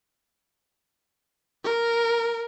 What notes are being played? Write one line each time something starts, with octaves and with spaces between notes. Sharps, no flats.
A#4